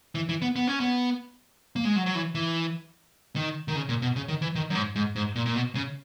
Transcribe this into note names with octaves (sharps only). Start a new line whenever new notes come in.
E3
E3
B3
B3
C#4
B3
A#3
G#3
F#3
F#3
E3
E3
D#3
D#3
C#3
A#2
B2
C#3
D#3
E3
D#3
F#2
G#2
G#2
G#2
A#2
A#2
B2
C#3